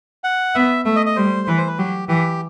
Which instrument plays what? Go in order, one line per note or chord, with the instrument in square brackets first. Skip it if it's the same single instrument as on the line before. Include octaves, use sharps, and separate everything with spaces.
[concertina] F#5
[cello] B3 [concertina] E5
[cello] A3 [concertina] E5
[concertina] D#5
D#5
[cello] G3 [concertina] C5
[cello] E3 [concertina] B4
[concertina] C5
B4
[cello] F#3 [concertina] G4
[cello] E3 [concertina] G4